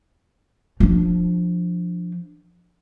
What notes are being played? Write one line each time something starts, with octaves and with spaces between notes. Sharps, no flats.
F3 D4